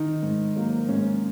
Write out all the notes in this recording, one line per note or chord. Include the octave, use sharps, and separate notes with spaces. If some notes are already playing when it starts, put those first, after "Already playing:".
Already playing: D#3 D#4
G#2
F#3 A#3
G#2 C#4